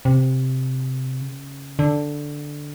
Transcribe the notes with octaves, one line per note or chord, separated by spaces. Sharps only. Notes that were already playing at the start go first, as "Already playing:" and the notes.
C3
C#3
D3